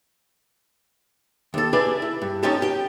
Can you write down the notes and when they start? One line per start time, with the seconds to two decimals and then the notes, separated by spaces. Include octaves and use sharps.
1.54 D#2 A4
1.73 D4 E4 G4 G#4 B4
2.02 E4
2.22 G2
2.43 F3 C#4 D#4 G4 A4
2.62 G4 G5